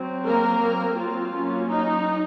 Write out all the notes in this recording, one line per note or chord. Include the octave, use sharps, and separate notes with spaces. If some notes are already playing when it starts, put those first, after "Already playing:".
Already playing: F#3 C4
A#3 A#4
F#3 C4
F4
F#3 A#3 C#4
D#4